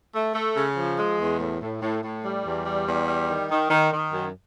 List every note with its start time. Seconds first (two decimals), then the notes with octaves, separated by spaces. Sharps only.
0.13 A3
0.34 A3
0.56 C#3
0.76 F3
0.98 G#3
1.18 E2
1.40 A2
1.60 A2
1.81 A2
2.02 A2
2.24 G3
2.45 E2
2.66 G3
2.87 E2
3.07 G3
3.28 D#3
3.50 D#3
3.70 D#3
3.92 D#3
4.13 F#2